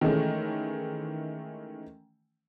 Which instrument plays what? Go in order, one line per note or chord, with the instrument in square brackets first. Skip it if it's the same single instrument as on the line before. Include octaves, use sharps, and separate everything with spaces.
[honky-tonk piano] D#3 E3 G#3 A3 C#4